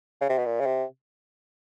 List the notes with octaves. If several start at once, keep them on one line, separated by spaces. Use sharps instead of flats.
C#3
C3
B2
A#2
C#3
C3